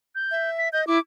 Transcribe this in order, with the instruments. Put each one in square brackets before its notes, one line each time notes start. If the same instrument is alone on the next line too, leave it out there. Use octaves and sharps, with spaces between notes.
[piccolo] G6
[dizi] E5
[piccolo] B6
[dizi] D#5 [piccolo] G6
[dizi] E4 [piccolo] D6